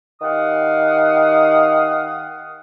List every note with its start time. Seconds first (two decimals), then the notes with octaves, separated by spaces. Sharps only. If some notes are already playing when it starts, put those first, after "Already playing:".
0.21 D#3 G4 F5 F#5 D#6